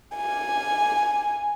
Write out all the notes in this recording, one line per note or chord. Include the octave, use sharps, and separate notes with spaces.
G#5